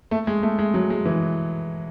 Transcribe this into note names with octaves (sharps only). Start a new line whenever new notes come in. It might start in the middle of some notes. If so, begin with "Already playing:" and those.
A3
G#3
A3
G#3
F#3
G#3
E3